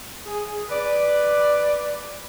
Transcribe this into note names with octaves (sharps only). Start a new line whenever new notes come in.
G#4
B4 D5